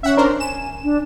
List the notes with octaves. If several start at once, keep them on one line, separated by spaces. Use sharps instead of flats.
C#4 E5 F#5
D4 A#4 C5
G#5 E7
D4